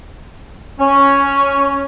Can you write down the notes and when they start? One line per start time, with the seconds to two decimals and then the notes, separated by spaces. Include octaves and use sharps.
0.80 C#4